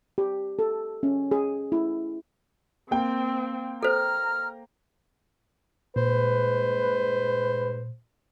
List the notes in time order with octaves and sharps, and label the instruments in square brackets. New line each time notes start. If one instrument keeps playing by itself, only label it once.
[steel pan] G4
A4
C#4
G#4
E4
[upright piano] A#3 G5 [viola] C4
[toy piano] A4 C5 [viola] A#5 [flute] F6
[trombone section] G2 G#3 B4 [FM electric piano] A#2 [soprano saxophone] C5